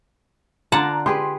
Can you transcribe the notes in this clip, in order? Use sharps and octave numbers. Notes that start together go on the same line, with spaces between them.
D3 F4 D5 F#5 A5 A#5
G4 G#4 B4 C6